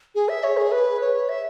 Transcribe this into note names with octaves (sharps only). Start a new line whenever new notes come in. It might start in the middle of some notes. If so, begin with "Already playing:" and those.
G#4
E5
C#5
G#4
B4
C#5
E5